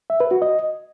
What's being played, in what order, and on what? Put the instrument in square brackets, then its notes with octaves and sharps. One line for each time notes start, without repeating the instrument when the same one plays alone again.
[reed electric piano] E5
B4
F#4
D#5